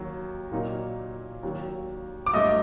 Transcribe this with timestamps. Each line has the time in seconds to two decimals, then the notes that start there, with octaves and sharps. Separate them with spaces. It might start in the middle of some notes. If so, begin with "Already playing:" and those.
Already playing: D#2 D#3 F#3
0.52 A#2 F#3 A#3 D#4
1.43 D#2 D#3 F#3
2.26 D6
2.33 G2 F#3 A3 D#5 D#6